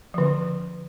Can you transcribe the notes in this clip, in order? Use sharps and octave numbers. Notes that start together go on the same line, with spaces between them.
D3 F3